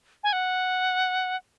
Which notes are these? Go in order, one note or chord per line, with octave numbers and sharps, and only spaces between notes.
G#5
F#5